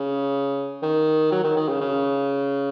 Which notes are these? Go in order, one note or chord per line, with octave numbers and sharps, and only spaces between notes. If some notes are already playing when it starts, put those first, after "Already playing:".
Already playing: C#3
D#3
F#3
D#3
D#3
C#3
C#3